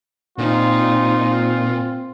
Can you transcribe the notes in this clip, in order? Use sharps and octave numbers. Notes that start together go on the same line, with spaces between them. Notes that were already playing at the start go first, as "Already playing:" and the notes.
A#2 C4 D#4 F4